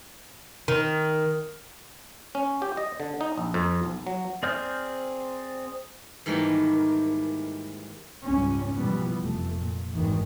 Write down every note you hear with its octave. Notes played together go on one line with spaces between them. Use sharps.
D#3
C#4
G4
D#5
D3
D#4
A#1
F2
B1
F#3
C4 G#4 D5 F6 G6
G#2 D#3 E3 G3 A3 A#3
C#2 G#2 G3 C#4
B2 E3 F3 G3 B3
F1 A3
A#2
G#1 D2 D#3 E3